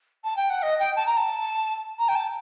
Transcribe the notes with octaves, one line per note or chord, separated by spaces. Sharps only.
A5
G5
F#5
D#5
G5
A5
A#5
A5
A#5
G5
A5